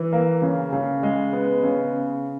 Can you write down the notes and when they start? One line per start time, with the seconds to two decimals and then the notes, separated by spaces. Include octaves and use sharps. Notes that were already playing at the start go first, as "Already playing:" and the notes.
Already playing: E3
0.13 A#3
0.42 C#3
0.73 C#3
1.03 G#3
1.33 B3
1.63 C#3